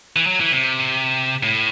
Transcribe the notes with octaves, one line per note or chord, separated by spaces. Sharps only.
E3
F#3
E3
C3
A2